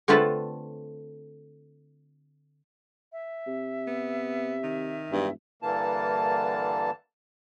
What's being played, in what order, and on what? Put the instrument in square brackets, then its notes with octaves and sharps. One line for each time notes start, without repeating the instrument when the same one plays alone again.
[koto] D3 A3 C4 F4 B4 A5
[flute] E5
[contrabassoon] C3
[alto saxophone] B3
D#3
[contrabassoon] E1 [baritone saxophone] G2
[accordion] G2 D3 E3 A#3 A5